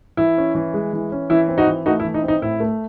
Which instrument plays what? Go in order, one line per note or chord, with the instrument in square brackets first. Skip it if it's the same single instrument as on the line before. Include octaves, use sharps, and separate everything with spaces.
[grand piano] E3 E4
C#4
E3
G#3
E3
C#4
E3 E4
C4
D#4 F#4
E3
A3 D#4 F#4
E4
E3
D#4
C4
D#4
A2 E4
A3